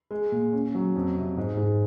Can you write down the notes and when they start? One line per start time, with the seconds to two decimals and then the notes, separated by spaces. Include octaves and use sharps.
0.11 G#3
0.32 A#2
0.53 C#4
0.75 F#3
0.96 F2
1.17 C3
1.37 G#2
1.57 G#2